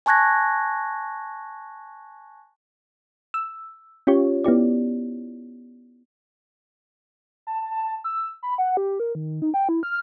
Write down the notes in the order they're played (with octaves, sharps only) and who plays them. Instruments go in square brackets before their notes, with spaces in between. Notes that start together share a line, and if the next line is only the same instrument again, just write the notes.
[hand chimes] G#5 A5 C#6 F#6 G#6 A#6
[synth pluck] E6
C#4 F4 G4 C#5
B3 E4 G4 D5
[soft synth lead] A5
A5
E6
B5
F#5
G4
A#4
D#3
D#4
G5
E4
F6